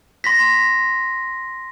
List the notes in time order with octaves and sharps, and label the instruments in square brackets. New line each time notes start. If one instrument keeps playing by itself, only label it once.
[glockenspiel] C6 A#6 B6